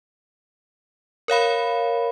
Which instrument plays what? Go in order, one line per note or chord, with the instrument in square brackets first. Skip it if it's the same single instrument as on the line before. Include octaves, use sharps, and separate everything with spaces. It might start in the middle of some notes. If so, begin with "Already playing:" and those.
[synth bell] A#4 C#5 F5 B5